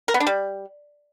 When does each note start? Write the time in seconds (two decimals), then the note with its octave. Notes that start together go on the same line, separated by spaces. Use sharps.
0.08 A#4
0.14 B3
0.20 D4
0.27 G3